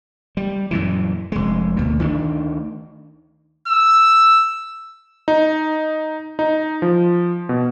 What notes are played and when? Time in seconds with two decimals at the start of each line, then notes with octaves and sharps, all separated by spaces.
0.37 G3
0.71 F#2 A#2 E3
1.32 F1 G#3
1.77 D2 B2
1.99 D2 D#3 A3 D4
3.68 E6
5.28 D#4
6.39 D#4
6.82 F3
7.49 B2